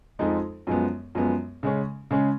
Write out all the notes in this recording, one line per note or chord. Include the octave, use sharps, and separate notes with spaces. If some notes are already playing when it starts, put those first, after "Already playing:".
F2 F3 G#3 D#4
F#2 F3 G#3 B3
F#2 F3 G#3 B3
C#3 G#3 C#4
C#3 G#3 C#4